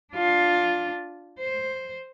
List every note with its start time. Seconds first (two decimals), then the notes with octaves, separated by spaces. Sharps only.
0.13 D4 F4
1.40 C5